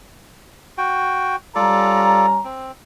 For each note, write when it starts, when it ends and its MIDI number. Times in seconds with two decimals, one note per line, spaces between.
0.78 1.36 66
0.78 1.36 79
1.55 2.40 55
1.55 2.40 61
1.55 2.26 65
1.55 2.26 69
1.55 2.26 74
1.55 2.40 82
2.44 2.72 60